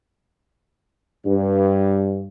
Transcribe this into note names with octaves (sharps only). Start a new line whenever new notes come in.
G2